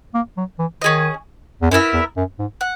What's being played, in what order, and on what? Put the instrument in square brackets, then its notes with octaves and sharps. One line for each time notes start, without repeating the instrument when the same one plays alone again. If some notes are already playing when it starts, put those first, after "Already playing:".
[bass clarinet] A#3
F#3
E3
[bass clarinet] D#3 [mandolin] C#4 G#4 D#5
[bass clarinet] E2
[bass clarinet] F#2 [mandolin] B3 E4 A#4 E5
[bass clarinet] E2
F#2
G#2
[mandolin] F#5